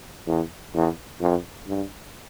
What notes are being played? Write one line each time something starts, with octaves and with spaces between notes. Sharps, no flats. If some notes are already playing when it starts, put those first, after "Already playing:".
E2
E2
F2
G2